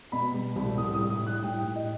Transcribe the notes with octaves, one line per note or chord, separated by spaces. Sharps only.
B2 B5
G3
C2
A2 D#6
D#6
G3
D#6
A2
F#6
A2 G5
A2
D#5